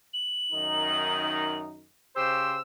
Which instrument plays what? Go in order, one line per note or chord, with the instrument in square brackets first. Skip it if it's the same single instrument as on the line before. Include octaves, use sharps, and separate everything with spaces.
[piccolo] F#7
[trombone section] F#2 D#3 D#4
[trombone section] C#3 G4 C5 [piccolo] E6